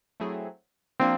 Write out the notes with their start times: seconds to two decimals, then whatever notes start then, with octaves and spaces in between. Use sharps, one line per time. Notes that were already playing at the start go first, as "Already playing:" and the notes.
0.20 F#3 A3 C4 E4 G#4
1.00 F3 A#3 C4 D4